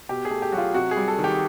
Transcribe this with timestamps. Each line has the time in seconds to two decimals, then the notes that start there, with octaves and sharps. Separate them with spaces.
0.09 B2 G4
0.25 G#4
0.31 A3
0.42 G4
0.52 F#3 F#4
0.58 F4
0.74 C3 F#4
0.91 G#4
0.97 G3
1.08 A4
1.19 D#3
1.24 G4